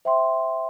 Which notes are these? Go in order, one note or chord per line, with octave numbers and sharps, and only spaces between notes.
C5 E5 G5 C6